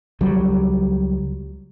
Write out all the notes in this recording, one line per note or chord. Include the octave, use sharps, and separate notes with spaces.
C#2 F#3 G3